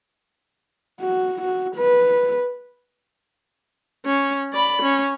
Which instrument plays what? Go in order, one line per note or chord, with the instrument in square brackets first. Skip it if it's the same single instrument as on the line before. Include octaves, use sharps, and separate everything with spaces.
[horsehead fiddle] F#4
F#4
B4
[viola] C#4
D5 B5
C#4